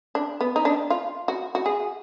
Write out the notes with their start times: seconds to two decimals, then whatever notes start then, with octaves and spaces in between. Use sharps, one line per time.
0.15 D4
0.41 B3
0.56 D#4
0.65 D4
0.90 F4
1.28 F#4
1.55 F#4
1.66 G#4